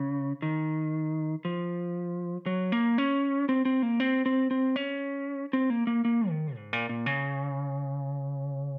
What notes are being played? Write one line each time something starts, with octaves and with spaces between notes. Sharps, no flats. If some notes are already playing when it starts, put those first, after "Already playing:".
Already playing: C#3
D#3
F3
F#3
A#3
C#4
C4
C4
A#3
C4
C4
C4
C#4
C4
A#3
A#3
A#3
D#3
G#2
A#2
A#2
C#3